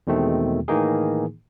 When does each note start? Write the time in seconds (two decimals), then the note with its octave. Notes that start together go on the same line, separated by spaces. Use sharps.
0.07 E2 B2 D#3 G#3 A3 C4
0.68 A2 D#3 E3 A#3 D#4 G#4